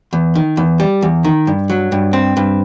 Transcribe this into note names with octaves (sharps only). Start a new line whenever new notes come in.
E2
D#3
E2
G3
E2
D#3
G2
F#3
G2
C4
G2